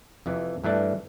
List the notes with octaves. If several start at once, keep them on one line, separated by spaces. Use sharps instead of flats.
F2 C3 E3
G2 E3 A3 D4